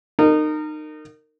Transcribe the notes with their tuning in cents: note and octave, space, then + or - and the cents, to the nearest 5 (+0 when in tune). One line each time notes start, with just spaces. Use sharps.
D#4 -25 A#4 -25